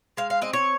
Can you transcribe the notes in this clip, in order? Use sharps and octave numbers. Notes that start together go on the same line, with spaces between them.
G#3 F5
F5
C4 D#5
C#5